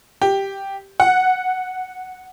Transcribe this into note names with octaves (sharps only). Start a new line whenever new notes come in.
G4
F#5